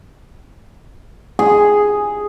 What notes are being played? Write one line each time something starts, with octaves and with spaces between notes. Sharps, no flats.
G#4